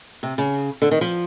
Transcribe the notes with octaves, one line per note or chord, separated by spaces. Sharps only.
C3
C#3
D3
D#3
F3